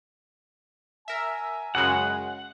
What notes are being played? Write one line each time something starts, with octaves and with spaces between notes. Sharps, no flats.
A#4 E5 G#5
F#2 C#3 G#3 F#5